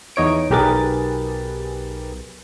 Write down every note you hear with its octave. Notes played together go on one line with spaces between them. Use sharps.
E2 D#4 C#5 D7
B1 G4 G#4 A#4 B4 A6